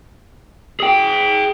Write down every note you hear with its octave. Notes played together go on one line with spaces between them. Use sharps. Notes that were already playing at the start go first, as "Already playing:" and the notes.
G#4 G5